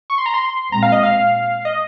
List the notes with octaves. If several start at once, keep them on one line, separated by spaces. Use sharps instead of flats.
C#6
C6
A#5
C6
A#2 G#3 C4 A#5
F5
D#5
F5
D#5